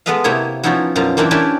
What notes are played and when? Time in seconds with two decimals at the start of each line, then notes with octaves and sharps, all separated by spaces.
0.06 G#3 B3 A4 B4 D#5 F5
0.24 C3 A#3 E4 C#5
0.63 F3 B3 C#4 D#4 E4 F#4
0.96 F#2 B2 F3 F5 A#5
1.17 E3 A#3 C4 D4 E4 A#4
1.31 C#4 D4 E4 G4 B4